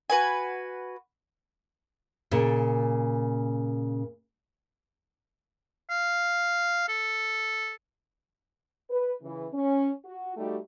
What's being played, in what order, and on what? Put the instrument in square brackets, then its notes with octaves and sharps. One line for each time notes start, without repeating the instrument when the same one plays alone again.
[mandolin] F#4 B4 G#5
[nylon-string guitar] A#2 C#3
[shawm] F5
A4
[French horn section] B4
C#3 E3
C#4
F#4
G3 A3 D#4 F#4 G4